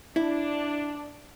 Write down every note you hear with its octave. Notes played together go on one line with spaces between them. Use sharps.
D4 E4